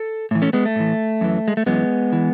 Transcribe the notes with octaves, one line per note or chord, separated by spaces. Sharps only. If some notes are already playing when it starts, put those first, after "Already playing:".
Already playing: A4
A2 E3
A3 C#4
G#3 B3
A3
A2 E3
F#2 E3
G#3
A3
F#2 E3 G#3 B3
E3